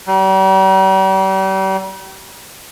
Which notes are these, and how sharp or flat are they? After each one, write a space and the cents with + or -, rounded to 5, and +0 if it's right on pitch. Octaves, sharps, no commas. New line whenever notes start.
G3 -40